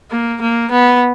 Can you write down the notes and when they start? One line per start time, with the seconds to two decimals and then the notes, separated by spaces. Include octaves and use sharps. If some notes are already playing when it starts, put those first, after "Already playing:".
0.11 A#3
0.41 A#3
0.71 B3